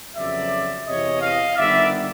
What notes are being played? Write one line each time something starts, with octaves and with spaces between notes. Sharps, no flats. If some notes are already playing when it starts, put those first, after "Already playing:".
F2 C#3 F#3 B3 D5 E5
E2 C3 E3 C#5 D#5
D#5 F5
G1 G2 D#3 G3 B3 D5 E5